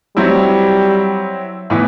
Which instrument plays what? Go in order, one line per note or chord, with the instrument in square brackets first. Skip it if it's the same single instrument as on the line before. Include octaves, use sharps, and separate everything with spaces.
[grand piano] F#3 C4 E4 [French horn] G3
[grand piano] A2 E3 B3 E4